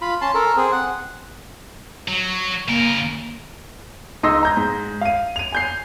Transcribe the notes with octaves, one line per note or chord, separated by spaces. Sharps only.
F4 B5
C#4 A5 C6
A4 A#4
C4 G#4
F#5
F#3
C#3 A#3 A#4
C#2 D#4 D#5 C6 E6 A#6
A#5 G6 A#6
G#2
F5 D#7
D#7 F7
G#5 G6 C7